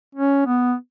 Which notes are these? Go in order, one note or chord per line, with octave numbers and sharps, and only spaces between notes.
C#4
B3